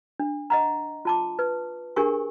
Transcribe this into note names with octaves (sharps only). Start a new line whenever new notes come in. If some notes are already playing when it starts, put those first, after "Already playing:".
D4
D#5 F#5 A#5
F4 A5 D6
B4
D4 G4 G#4 A#4 G#5 C#6